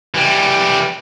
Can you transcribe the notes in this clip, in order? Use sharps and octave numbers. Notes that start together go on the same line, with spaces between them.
E3 G3